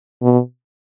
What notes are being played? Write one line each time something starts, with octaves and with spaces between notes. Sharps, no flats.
B2